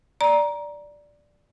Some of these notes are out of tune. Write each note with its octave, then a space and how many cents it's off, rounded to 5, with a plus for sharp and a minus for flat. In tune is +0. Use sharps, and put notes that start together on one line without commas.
D5 +0 A#5 +15